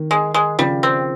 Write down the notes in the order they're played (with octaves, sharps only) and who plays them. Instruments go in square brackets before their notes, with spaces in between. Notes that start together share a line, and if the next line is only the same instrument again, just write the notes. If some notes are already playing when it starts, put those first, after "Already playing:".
Already playing: [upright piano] D#3
[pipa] G#3
G#3
[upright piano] C#3 F3 [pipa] G3
[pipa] C4